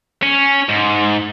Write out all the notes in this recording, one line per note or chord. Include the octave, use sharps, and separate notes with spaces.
C#4
G#2